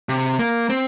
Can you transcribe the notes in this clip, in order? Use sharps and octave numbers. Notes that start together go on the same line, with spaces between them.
C3
A#3
C4